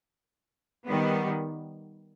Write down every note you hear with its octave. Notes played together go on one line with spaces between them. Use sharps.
D#3 G3 B3